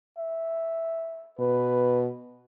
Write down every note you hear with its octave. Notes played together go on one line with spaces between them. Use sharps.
E5
B2 B4